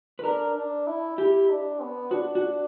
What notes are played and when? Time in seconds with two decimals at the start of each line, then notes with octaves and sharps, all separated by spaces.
0.19 B4
0.24 D4 A#4
0.55 D4
0.87 E4
1.18 E4 G4
1.49 D4
1.80 B3
2.11 D4 F#4
2.35 F#4